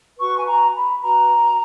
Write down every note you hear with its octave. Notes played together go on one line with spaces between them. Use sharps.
F#4 B4 C#6
G#5
A#5
B5
F#4 B4 A#5